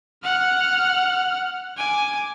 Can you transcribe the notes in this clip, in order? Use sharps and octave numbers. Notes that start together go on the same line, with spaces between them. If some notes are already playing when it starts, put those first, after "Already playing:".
F#5 F6
G#5 D6